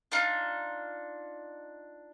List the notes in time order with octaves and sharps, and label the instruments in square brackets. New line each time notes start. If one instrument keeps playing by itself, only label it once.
[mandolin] D4 D#4 F4